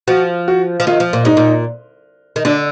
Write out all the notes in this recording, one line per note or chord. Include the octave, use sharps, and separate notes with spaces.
F3 F#4
F#4
F3
D#3 F4
F3
A#2
G#2 D#4
A#2
D#3
D3 D4